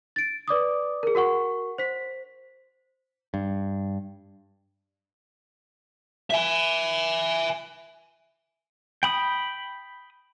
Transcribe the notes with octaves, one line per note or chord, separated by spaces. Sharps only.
A6 D7
B4 D5 D6 D#6
G#4 A#4
F#4 A#4 F#5 C#6
C5 B6
G2
E5 G#5
G5 B5 D#6